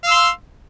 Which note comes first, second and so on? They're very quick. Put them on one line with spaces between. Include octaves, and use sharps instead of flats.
F5 E6 C6